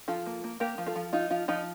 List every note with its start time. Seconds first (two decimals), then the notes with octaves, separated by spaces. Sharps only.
0.08 F3 F4 A4
0.26 A#3
0.44 A#3
0.60 A#3 G4 A#4
0.78 F3
0.87 F4 A4
0.96 F3
1.13 D#4 F4
1.31 F3 F4
1.48 F3 D#4